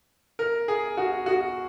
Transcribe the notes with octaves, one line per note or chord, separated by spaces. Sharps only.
A#4
G#4
F#4
F#4